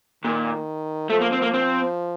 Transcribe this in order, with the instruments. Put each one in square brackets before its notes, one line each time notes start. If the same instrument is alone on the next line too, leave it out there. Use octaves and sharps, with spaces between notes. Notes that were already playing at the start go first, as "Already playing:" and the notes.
[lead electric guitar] A#2 [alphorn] D#3
[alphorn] F3 [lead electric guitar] A3
[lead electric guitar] A#3
C4
A#3
C4